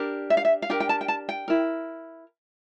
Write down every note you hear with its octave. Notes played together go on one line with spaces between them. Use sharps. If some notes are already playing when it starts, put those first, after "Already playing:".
Already playing: D4 G4 A#4
E5
F5
E5
F5
D4 G4 A#4 G5
G5
A5
G5
A5
G5
E4 A#4